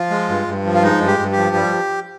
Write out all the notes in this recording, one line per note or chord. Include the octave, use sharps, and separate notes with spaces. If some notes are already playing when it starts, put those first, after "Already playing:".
Already playing: F3 F4
G#3
G2
G2
F3
F4
G#3 D#4
G2
G4
G2
G4
F3
G3